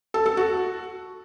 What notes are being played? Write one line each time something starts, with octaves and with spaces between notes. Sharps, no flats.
A4
A4
F#4